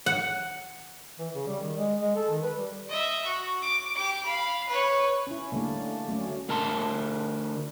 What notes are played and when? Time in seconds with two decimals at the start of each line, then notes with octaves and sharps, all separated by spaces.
0.06 F#5
1.19 E3
1.34 C#3
1.47 G3
1.61 D#3
1.77 G#3
2.01 G#3
2.16 A4
2.30 D#3
2.43 B4
2.58 G3
2.88 D#5 E5
3.25 F#4
3.62 D6
3.95 G4 D6
4.25 F5 B5
4.68 B4 C#5
5.27 C#4 E4
5.52 D3 G3 A3 A#3 D4
6.08 F#3 A3 C#4 D5
6.49 D2 A#4 A5 C6